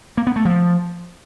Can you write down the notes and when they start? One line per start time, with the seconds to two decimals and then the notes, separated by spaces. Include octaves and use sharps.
0.17 A#3
0.27 B3
0.36 A3
0.45 F3